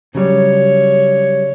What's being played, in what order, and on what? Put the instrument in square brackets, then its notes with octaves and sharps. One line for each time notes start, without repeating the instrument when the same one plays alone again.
[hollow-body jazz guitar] C#3 F#3 G3 [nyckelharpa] C#5